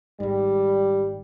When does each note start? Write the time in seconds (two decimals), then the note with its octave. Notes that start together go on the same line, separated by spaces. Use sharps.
0.20 G#1 G#2 G3